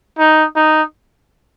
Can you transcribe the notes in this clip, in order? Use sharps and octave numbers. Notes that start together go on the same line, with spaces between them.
D#4
D#4